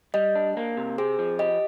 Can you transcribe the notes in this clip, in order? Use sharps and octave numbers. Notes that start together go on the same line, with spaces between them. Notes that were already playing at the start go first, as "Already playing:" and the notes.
G3 D#5
D4
A#3
C3
C4 G#4
F3
G4 D#5